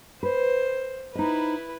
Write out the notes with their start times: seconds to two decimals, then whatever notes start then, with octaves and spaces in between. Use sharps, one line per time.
0.23 B4 C5
1.15 D#4 E4 B4 C5 D#5